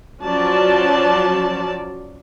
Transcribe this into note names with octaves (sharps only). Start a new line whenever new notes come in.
F3 F#3 C#4 D5 A5